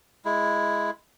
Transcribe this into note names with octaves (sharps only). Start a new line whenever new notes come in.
G#3 E4